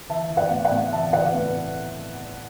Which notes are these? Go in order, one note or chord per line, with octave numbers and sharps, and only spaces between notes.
E3 E5 A5
E3
D5 F#5
A2
D5 F#5
A2
E3 E5 A5
E3 D5 F#5
A2 B4